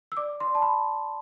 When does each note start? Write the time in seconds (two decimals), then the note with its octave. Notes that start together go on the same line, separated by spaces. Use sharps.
0.12 E6
0.17 D5 D6
0.40 C6
0.47 D5
0.55 A5
0.62 B5